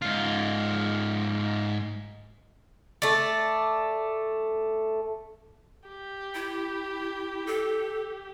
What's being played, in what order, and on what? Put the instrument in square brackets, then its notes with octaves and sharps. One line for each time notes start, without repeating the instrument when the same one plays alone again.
[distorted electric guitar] G#2 F4
[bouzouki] A3 D5
[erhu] G4
[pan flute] E4
A4